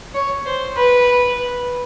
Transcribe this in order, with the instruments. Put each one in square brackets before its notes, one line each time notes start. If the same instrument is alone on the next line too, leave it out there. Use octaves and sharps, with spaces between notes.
[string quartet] C#5
C5
B4